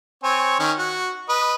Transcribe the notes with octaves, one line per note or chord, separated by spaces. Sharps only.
C4 C#5 G#5
D#3 C#4
F#4
B4 D#5